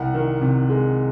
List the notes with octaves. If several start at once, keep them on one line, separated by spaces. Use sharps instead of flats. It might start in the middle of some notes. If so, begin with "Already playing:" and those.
Already playing: C2 F#5
D#3
C3
G#3